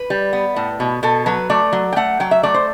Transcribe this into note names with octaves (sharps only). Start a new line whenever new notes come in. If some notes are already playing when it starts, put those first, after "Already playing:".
Already playing: B4
G3
B3
A2
B2
B2 A4
F#3 B4
A3 D5
F#3
G5
A3 F#5
F#3 G5
E5
A3 D5
C5